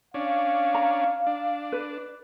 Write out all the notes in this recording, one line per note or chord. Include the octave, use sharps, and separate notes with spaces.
C#4 D4 F5
A#5
D4
B4